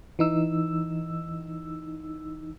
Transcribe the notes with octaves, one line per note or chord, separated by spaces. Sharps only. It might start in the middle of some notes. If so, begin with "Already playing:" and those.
E3 D#4 E6